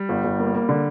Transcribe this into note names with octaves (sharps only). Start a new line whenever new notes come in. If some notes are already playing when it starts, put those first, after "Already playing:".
Already playing: G3
G1
G1
A#3
A#3
D3